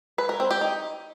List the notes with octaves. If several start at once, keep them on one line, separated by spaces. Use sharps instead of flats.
B4
A#4
C4
G4
D#4